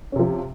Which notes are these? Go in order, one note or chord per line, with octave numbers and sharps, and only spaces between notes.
C3 F3 C#4